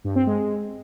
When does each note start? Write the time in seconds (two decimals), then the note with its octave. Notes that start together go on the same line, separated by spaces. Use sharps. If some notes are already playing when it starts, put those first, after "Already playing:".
0.04 G2
0.16 C4
0.27 G#3